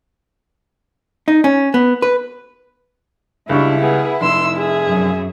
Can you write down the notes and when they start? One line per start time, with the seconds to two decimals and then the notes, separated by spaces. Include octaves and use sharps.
1.28 D#4
1.44 C#4
1.74 B3
2.02 B4
3.49 C#2 G3 D4 E4 C#6
3.81 B3 G#4
4.21 F1 C6 E6
4.57 G#4 E5
4.88 F#2